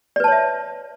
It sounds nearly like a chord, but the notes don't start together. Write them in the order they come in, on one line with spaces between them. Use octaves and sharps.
D5 B4 A5 C#5 E5